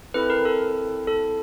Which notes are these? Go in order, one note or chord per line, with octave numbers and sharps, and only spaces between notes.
C4 E4 A4 B4
A#4
A4
A4